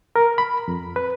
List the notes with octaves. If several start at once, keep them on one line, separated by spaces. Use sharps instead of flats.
A#4
B5
F2
B4